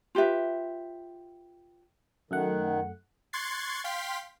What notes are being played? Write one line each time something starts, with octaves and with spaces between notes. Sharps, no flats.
F4 G4 B4 E5
F#2 D#3 A3 F#5
C6 C#6 F#6 G#6 A6 C7
F5 G5 C6 B6